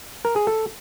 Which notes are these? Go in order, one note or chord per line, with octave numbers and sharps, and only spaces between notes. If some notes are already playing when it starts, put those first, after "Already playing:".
A#4
G#4
A4